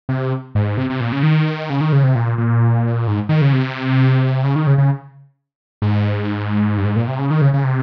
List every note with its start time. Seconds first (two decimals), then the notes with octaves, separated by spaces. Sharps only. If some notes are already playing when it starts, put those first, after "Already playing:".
0.09 C3
0.55 G#2
0.78 C3
0.90 C3
1.00 A#2
1.12 C#3
1.23 D#3
1.70 C#3
1.81 D#3
1.92 C#3
2.03 C3
2.15 A#2
2.38 A#2
3.07 G#2
3.29 D#3
3.42 C#3
3.53 C3
4.44 C#3
4.56 D#3
4.67 C#3
4.78 C#3
5.82 G#2
6.78 G2
6.85 G#2
6.96 A#2
7.08 C3
7.19 C#3
7.31 D#3
7.42 C#3
7.54 C#3
7.64 C3